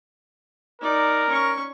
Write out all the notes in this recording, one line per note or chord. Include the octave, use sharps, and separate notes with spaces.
D#4 A#4 D5
C#4 C#6